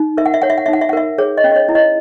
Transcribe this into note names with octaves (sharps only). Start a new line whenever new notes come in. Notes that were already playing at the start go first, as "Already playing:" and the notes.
Already playing: D#4
A#4 E5
F#5
E5
C#5 F#5
E5
F#5
D#4 E5
F#5
E5
F#5
A#4 E5
G#4 C#5
D#5
C#4
D#5
C#5
E4
D#5